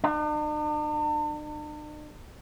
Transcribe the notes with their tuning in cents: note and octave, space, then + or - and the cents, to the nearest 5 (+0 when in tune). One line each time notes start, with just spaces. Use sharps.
D4 +45